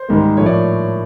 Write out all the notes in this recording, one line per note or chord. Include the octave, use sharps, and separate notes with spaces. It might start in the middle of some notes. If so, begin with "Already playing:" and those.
Already playing: C5
G#2 D#3 G3 A#3
A2 F3 A#3 C#5
D5